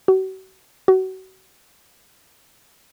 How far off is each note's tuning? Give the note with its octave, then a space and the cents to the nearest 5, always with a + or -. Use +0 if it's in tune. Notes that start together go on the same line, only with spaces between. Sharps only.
F#4 +40
F#4 +30